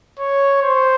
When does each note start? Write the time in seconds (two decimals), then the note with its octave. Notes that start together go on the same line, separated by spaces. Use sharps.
0.19 C#5
0.63 C5